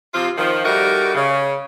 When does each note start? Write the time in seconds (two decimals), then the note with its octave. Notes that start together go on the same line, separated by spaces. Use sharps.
0.14 C3 F3 C4 F4
0.38 D#3 F3
0.64 G3 A3 D#4 F#4 A#4
1.15 C#3